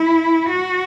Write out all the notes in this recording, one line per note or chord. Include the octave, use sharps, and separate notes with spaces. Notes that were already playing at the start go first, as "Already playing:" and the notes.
Already playing: E4
F#4